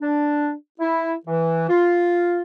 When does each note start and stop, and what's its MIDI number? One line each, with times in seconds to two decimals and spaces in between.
0.01 0.54 62
0.80 1.14 64
1.26 1.67 52
1.69 2.42 65